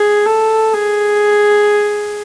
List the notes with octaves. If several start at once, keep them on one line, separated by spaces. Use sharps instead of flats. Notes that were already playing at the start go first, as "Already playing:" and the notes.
Already playing: G#4
A4
G#4